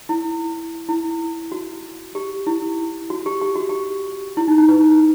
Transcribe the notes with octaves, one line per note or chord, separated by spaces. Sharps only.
E4
E4
F#4
G4
E4
F#4
G4
G4
F#4
G4
E4
D#4
D#4
B4